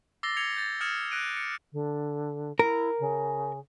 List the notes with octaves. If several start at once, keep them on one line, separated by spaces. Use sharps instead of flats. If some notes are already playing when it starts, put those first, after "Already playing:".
D6 E6 A6 A#6 C7 G7
G#6 C#7 F7 G7
G6 A6
D#6 F6 G#6 A6 C#7 E7
F#6 A#6 D7 D#7
C#7
D3
E4 A#4
C#3